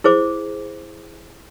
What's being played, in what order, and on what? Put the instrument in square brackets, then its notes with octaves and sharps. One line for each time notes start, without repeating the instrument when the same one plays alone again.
[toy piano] E4 G#4 C5 D6